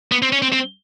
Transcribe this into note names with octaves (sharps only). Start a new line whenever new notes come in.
B3
C4
C#4
C4
C4